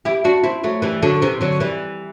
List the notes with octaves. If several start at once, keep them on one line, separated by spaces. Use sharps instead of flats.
E4 G4
D4 F#4
C4 E4
F#3 A3
E3 G3
D3 F#3
C3 E3
D3 F#3
E3 G3